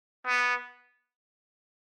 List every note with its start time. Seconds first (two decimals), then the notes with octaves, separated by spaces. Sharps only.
0.26 B3